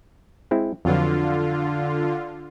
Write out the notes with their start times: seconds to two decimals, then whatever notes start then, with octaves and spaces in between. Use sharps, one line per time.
0.51 G#3 C4 E4
0.85 F2 D3 F#3 F4 B4